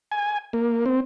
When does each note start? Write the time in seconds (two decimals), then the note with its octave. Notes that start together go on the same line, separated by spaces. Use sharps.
0.12 G#5
0.53 A#3
0.86 C4